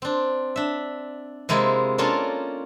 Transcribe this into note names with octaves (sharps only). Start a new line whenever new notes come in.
C4 D4
D4 E5
C3 G#3 A#3 E4 F4 G#4
A#3 C#4 D4 F4 A4 A#4